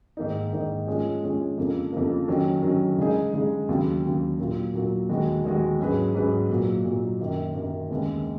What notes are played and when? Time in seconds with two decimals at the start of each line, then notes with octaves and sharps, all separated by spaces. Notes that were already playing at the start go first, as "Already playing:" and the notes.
0.17 G#2 D#3 A#3 D#4
0.52 G#2 D#3 A#3 D#4
0.87 F3 G#3 C#4 G#4
1.22 F3 G#3 C#4 G#4
1.57 F2 C#3 F3 A#3
1.93 F2 C#3 F3 A#3
2.28 D#3 F#3 C#4
2.62 D#3 F#3 C#4
2.98 C#3 G#3 D#4 G#4
3.33 C#3 G#3 D#4 G#4
3.69 D#2 C#3 F#3
4.04 D#2 C#3 F#3
4.39 A#2 F#3 A#3 F4
4.74 A#2 F#3 A#3 F4
5.09 D#2 D#3 G#3 B3 F#4
5.45 D#2 D#3 G#3 B3 F#4
5.79 G#2 F#3 C#4 G#4 B4
6.14 G#2 F#3 C#4 G#4 B4
6.50 A#2 F#3 A#3
6.85 A#2 F#3 A#3
7.20 F#2 D#3 A#3
7.55 F#2 D#3 A#3
7.90 D#2 C#3 G#3 B3